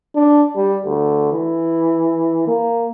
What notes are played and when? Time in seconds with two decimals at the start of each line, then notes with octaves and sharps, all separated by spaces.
0.15 D4
0.56 G3
0.86 D2
1.32 E3
2.47 A#3